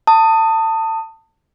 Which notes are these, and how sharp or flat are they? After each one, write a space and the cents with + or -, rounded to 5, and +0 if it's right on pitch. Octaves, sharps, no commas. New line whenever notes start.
A5 +25 D#6 +0